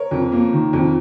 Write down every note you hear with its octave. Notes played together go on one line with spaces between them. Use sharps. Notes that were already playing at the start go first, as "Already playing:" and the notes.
Already playing: A#4 C#5
F2
A#3
D#3
F2